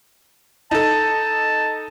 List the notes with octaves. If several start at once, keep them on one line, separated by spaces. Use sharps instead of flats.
D#4 A4 A5